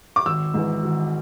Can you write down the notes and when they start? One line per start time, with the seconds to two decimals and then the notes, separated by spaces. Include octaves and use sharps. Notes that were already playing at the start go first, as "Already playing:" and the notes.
0.16 D6
0.26 G#1 E6
0.54 G#2 E3
0.83 G#1